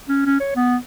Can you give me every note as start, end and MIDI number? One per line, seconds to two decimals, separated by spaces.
0.09 0.25 61
0.26 0.37 61
0.40 0.52 73
0.56 0.76 59